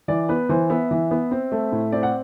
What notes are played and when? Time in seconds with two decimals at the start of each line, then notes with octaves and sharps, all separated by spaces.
0.08 E3 D5
0.29 B3 B4
0.49 E3 C5
0.70 B3 E5
0.91 E3
1.11 B3
1.31 C4
1.52 A3
1.72 A2
1.92 C4 D5
2.03 F#5